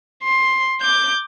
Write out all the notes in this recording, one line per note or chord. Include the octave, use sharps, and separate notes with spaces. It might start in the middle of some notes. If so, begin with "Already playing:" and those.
C6
D6 G6